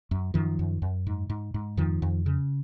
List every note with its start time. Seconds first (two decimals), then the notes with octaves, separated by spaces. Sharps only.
0.11 F#2
0.34 F#2 D#3 F3
0.59 F#2
0.82 F#2
1.07 G#2
1.30 G#2
1.54 G#2
1.77 F2 D#3 F3
2.02 F2
2.26 C#3